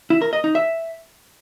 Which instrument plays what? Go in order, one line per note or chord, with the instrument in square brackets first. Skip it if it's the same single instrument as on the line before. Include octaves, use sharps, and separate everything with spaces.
[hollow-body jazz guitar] E4
A#4
D#5
D#4
E5